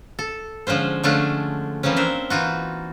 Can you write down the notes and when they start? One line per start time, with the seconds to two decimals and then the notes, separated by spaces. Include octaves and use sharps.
0.19 A4
0.67 D3 F3 G#3 C#4 C5
1.03 D3 G#3 A3 C#4 D4 F4
1.83 E3 F3 A#3 C4 C#4
1.97 D4 A#4 C5 E5
2.30 E3 D#4 F4 F#4